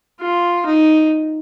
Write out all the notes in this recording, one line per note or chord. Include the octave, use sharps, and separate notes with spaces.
F4
D#4